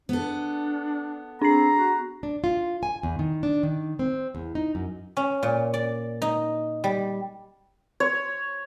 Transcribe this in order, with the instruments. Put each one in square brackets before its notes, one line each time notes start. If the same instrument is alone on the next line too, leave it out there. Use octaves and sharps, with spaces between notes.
[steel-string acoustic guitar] B3 A4 [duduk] D4
[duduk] C4 [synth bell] D4 C7 [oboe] A#5
[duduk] F#4
[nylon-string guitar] D4
F4
G#5
E2
D#3
D4
D#3
C4
E2
D#4
F#2
[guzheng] C#4
A#2
D5
D#4
G3
[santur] C#5